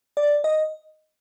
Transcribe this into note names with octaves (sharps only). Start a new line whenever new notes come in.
D5
D#5